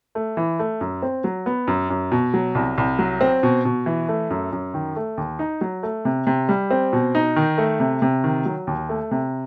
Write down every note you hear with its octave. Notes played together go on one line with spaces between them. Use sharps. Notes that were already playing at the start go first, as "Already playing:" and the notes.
A3
E3
A3
F#2
C4
F#3
B3
F#2
F#2
B2
F#3
C2
C2
F#3
C4
B2
B2
E3
A3
F#2
F#2
D#3
A3
D#2
D#4
F#3
A3
C3
C3
G3
C4
B2
D#4
D#3
A3
C3
C3
D#3
F#3
D#2
A3
C3